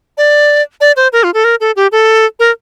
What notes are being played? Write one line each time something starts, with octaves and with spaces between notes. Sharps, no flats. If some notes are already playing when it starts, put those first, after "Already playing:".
D5
D5
C5
A#4
F4
A4
A#4
A4
G4
A4
A#4